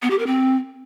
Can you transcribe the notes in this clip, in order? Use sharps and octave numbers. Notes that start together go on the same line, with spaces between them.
B3
G4
A#4
C4